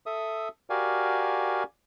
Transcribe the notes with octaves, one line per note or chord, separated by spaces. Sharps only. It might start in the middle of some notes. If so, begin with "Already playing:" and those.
A4 E5 D#6
F#4 G4 A#4 D5 F5 G#5